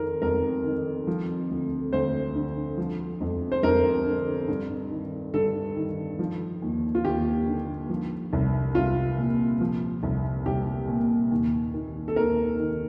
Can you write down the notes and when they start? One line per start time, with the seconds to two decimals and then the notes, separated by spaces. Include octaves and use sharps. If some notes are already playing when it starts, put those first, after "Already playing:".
Already playing: F2 D#3 A#4
0.22 F2 A#4
0.64 D#3
1.07 F3
1.50 D2
1.92 D2 C5
2.36 D3
2.78 F3
3.21 F2
3.52 C5
3.63 F2 A#4
4.06 D3
4.48 G2
4.91 D#3
5.33 G2 A4
5.76 D#3
6.19 F3
6.62 D#2
6.95 F4
7.04 D#2 G4
7.47 D3
7.90 F3
8.33 C2
8.75 C2 F4
9.18 A#2
9.61 F3
10.03 C2
10.46 C2 G4
10.88 A#2
11.31 D#2
11.74 D#3
12.08 A4
12.16 D#2 A#4
12.59 D#3